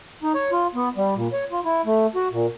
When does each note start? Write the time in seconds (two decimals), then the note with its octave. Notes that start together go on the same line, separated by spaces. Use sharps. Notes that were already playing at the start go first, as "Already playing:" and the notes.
0.23 D#4
0.34 C#5
0.52 F4
0.75 B3
0.97 G3
1.16 A#2
1.33 C#5
1.52 F4
1.65 E4
1.86 A3
2.15 F#4
2.32 A#2